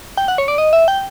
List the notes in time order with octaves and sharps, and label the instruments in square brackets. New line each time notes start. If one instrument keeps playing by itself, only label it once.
[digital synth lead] G5
F#5
C#5
D5
D#5
E5
G5